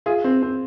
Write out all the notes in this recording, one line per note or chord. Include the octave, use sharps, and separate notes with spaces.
F4 G#4
C4
C4